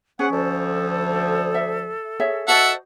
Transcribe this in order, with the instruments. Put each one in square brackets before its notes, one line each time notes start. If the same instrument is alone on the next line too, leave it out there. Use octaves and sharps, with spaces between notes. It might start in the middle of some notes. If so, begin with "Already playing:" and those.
[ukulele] C#4 [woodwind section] G#4 F#5 [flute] C5
[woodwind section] D2 F3 [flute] A4
[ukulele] E5
G#4 C#5 E5
[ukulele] F#4 C5 D#5 [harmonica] E5 F#5 [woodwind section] A5